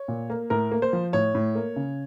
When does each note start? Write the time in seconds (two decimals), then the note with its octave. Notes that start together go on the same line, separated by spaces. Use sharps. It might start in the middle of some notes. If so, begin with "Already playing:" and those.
Already playing: C#5
0.08 A#2
0.30 A#3
0.50 A2 A#4
0.72 A#3
0.82 C5
0.93 F3
1.13 A2 C#5
1.35 A2
1.55 A#3
1.76 C#3